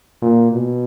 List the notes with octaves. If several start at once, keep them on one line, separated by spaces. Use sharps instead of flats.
A#2
B2